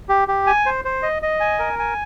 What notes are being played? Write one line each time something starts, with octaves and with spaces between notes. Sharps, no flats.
G4
G4
G#5
C5
C5
D#5
D#5
G#5
A#4
G#5